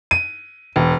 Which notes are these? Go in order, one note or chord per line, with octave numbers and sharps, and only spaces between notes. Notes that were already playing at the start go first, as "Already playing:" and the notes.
D#7
E1